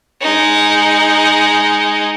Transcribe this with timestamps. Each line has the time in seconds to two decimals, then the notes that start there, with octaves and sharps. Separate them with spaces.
0.21 G#3 D#4